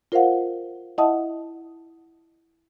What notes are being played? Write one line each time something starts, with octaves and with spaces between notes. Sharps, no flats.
F4 A#4 C5 D#5 F5 F#5
E4 D#5 E5 F#5 A5 D#6